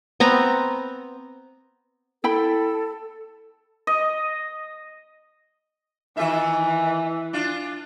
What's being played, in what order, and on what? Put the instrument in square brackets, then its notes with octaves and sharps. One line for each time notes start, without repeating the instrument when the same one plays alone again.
[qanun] B3 C4 A#5
[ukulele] E4 G5 B5 [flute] A4
[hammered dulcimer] D#5
[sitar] D#3 F4 E5 [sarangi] E3
[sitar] D4 F4